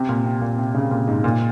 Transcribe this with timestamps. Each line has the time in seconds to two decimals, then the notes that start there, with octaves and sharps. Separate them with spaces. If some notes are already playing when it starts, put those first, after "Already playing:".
Already playing: C3
0.09 A#2
0.25 C3
0.41 A#2
0.58 C3
0.75 C#3
0.91 A#2
1.07 G#2
1.24 A#2